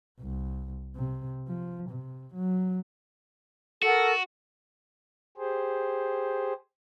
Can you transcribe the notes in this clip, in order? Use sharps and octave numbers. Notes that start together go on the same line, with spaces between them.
C2
C3
F3
C3
F#3
F#4 A4 A#4 F#5
G4 G#4 C5